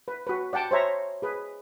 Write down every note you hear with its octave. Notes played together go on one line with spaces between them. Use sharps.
B4
F#4 B4
D5 F#5 G5 A5
C5 C#5 E5 A#5
G#4 B4